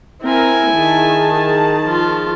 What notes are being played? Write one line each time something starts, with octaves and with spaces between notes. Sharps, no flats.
C4 E4 A#4 G#5
D#3 G#4 A5
F3 F4